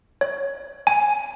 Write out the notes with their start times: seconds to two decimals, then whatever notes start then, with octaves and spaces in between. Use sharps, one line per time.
0.21 C#5
0.87 G#5